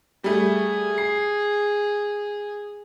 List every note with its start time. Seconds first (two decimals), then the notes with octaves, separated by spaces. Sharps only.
0.24 G3 A3 G#4
0.98 C7